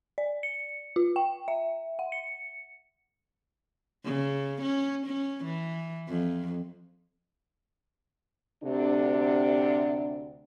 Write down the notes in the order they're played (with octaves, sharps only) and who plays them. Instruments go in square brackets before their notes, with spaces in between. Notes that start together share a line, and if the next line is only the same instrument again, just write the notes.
[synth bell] D5
C#7
F4
G5
E5
F#5
C#7
[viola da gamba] C#3
C#4
C#4
E3
F2
[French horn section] D2 C3 D4